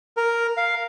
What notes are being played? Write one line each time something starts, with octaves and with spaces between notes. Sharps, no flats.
A#4
F5